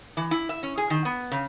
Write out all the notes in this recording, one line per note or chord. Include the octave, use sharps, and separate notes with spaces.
E3
E4
E5
C#4
G#4
D#3
B3
C#3